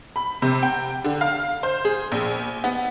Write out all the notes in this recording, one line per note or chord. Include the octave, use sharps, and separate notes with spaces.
B5
C3
G5
D3
F5
C5
G#4
A#1
B3